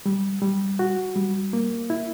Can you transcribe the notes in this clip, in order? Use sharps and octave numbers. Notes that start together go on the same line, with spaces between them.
G3
G3
F#4
G3
A#3
E4